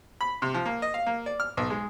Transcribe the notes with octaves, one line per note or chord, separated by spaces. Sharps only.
B5
C3
F3
A#3
D#5
F5
A#3
D5
F6
B1
G#3